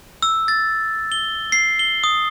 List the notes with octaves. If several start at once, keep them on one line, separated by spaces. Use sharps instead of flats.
E6
A6
G7
C7
G7
D#6